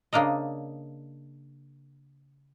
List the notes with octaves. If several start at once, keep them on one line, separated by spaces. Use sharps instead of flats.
C#3 A#3 D4 A#4 D#5